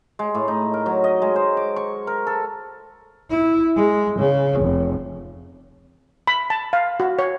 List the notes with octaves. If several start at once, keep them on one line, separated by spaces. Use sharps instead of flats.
G#3
A2
D#4
A#4
F#3
D#5
G#3
C5
D6
C#6
A#4
A4
E4
G#3
C#3
F1
B5
A5
F5
F#4
C#5